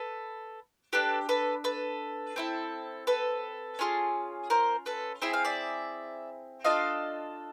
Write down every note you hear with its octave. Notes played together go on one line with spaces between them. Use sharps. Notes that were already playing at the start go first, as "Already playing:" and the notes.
Already playing: A4 B4
D4 G4 A4 B4
A4 B4
A4 B4
C4 E4 A4
A4 B4
C#4 F4 G#4
A#4 C5
A4 B4
C4 E4 G#4 E5
F5
D5 E5
D4 F4 A4 D#5 F5